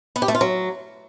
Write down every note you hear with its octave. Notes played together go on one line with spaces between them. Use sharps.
B3
G4
A3
F4
F#3